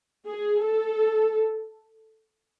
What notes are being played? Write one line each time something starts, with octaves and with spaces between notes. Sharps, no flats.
G#4
A4